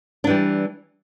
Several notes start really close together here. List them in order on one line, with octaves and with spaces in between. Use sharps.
D4 E3 G3